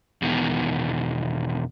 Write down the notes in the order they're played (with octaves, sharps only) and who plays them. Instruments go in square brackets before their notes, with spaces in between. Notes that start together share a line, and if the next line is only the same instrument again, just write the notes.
[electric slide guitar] E2 B2 D#3